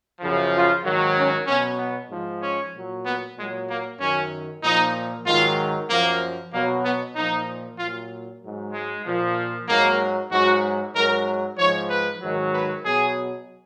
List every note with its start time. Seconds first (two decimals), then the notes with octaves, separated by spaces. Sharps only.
0.20 F#2 C#3 F3
0.53 F4
0.85 G#2 D#3 F#3
1.16 C#4
1.47 B2 F#3 C#4
1.79 B3
2.10 G#2 F3
2.43 C#4
2.74 A#2 F#3
3.06 B3
3.37 A#2 F#3 G#3
3.69 A#3
4.00 F#2 D#3 F#3 C#4
4.63 A#2 F3 D#4
5.26 G#2 D#3 F#3 F4
5.90 F#2 F3 A#3
6.54 B2 F#3 A#3
6.84 B3
7.16 A#2 F3 D#4
7.79 A#2 F#3 F4
8.42 G#2 F#3
8.74 G#3
9.05 A#2 F3
9.69 G#2 F#3 A#3
10.32 G#2 F#3 F#4
10.95 G#2 F#3 A#4
11.58 G#2 F3 C#5
11.90 B4
12.22 G#2 D#3 F#3
12.54 B4
12.85 B2 F#3 G#4